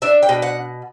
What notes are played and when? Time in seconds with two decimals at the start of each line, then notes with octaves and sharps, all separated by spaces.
0.02 D4 E5
0.23 G5
0.29 B2
0.42 F#5